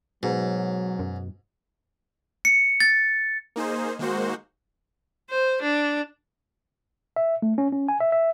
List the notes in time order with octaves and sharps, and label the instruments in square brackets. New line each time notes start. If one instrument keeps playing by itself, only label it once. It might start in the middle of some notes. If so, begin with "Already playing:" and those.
[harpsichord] G#2 [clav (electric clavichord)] B2 D#4 A#5 [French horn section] F#3
[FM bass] F#2
[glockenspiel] C#7
A6
[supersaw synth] A#3 D#4 G#4 C5
D#3 G#3 A#3 F#4 C5
[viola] C5
D4
[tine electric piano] E5
A3
C#4
C#4
G#5
E5
E5